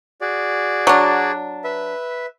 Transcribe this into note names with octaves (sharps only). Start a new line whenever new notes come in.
F#4 G#4 D5
F#3 D4
B4 E5